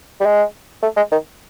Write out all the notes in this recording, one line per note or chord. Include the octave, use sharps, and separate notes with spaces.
G3
G#3
A3
G#3
D#3